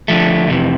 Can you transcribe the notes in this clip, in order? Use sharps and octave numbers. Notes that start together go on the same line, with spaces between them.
D3 F3 A3
F2 C3 E3